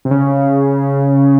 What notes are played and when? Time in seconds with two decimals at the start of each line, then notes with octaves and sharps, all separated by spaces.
0.05 C3
0.11 C#3